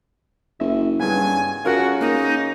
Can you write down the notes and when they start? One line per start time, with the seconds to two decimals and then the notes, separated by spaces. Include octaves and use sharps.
0.60 F#1 E5
0.99 G2 C#3 B3 G#5
1.65 C#3 F4 F#4 A#4 F#5
2.01 A#3 D#4